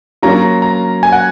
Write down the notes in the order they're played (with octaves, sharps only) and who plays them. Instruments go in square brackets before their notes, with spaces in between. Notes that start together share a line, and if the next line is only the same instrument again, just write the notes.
[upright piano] F#3 A#3 C#4 F4 [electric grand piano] A#5
[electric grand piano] A#5
G#5
F#5